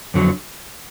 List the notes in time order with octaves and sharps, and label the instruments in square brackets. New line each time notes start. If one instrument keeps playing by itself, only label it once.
[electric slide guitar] F2 D3 F#3